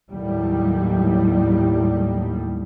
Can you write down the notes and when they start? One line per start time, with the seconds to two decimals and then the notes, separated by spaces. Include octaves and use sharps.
0.10 D#2 A2 F#3 G3